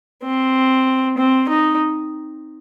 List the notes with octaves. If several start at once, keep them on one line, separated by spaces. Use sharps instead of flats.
C4
C4
D#4